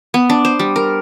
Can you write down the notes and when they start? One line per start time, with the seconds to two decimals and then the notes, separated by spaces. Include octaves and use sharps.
0.14 B3
0.30 D4
0.45 C5
0.59 G3
0.76 A#4